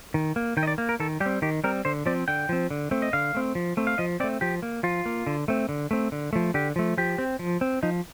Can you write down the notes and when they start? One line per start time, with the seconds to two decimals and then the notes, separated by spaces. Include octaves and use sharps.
0.14 D#3
0.36 A#3
0.57 D#3 G5
0.63 D#5
0.67 D5
0.78 A#3
0.89 A#4
1.00 D#3 A4
1.20 G3 G4
1.26 C4
1.42 D#3 G4
1.64 G3 C4 A#4
1.85 D3 C5
2.06 F3 C4 D5
2.28 D3 G5
2.49 F3 C4
2.70 D3
2.91 A3 C4
3.02 D#5
3.13 D3 F5
3.35 A3 C4
3.55 F3
3.77 A3 C4
3.87 F5
3.98 F3 D#5
4.20 C4 D5
4.24 A3
4.41 F3 G4
4.62 A#3
4.83 F3 F4
5.06 A#3
5.27 D3
5.48 A3 C4
5.69 D3
5.91 A3 C4
6.12 D3
6.33 F3 A3
6.54 D3 G4
6.76 F3 A3
6.98 F3 G4
7.18 C4
7.39 F3
7.61 C4
7.83 F3 D#4